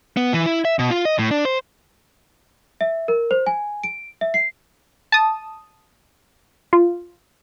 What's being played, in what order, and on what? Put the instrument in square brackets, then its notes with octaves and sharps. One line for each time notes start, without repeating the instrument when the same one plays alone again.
[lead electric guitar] B3
E3
E4
E5
B2
F4
D#5
A2
D4
C5
[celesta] E5
A#4
C5
G#5
D7
E5
C7
[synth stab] A5 D#6
F4